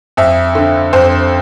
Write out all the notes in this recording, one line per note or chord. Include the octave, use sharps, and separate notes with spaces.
F2 E5
D3
F2 C5